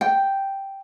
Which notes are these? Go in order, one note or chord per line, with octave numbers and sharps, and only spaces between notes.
G5